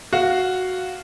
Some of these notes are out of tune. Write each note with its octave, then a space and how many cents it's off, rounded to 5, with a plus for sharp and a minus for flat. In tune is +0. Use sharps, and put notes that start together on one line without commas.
F#4 +0 F5 +0